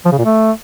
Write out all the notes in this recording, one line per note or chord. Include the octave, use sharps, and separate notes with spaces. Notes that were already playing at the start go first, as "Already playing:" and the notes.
F3
C#3
A#2
A3